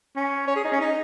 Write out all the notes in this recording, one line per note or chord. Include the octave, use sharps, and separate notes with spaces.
C#4
C#5
G#4
D#4
C#4
D#4